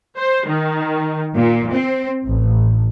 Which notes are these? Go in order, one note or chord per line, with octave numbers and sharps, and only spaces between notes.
C5
D#3
A#2
C4
A1